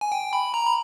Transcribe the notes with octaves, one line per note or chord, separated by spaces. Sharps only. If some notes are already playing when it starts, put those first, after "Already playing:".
G#5
G5
B5
A#5
B5